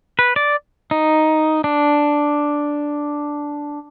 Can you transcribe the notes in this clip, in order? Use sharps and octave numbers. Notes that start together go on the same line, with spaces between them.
B4
D5
D#4
D4